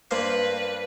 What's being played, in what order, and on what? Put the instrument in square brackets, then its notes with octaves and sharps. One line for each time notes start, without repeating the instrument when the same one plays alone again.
[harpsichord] G2 A#3 C5 [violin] B4